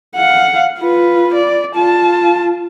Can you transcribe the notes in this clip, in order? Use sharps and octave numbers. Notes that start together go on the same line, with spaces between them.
F5 F#5
F4 B4
D5
F4 A5